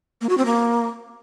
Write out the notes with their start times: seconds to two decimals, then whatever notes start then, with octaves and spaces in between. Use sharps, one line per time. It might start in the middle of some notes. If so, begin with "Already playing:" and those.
0.21 A#3
0.29 F#4
0.38 C4
0.46 A#3